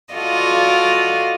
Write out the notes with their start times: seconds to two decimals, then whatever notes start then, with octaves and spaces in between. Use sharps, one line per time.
0.14 F4 F#4 A4 D5 D#5 F5